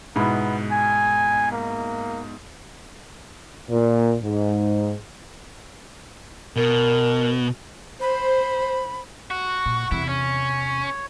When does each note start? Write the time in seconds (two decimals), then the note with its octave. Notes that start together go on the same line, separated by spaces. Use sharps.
0.16 G#2 B2 B3 E4
0.71 G#5
1.52 A#3
3.70 A#2
4.22 G#2
6.56 B2 A#4
8.01 C5 B5
9.31 F#4 F#5 C#6
9.66 A#2
9.91 E2 C3 E4
10.09 C#4 C#5